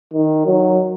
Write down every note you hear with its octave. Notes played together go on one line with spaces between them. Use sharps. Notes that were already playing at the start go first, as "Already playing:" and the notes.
D#3
F#3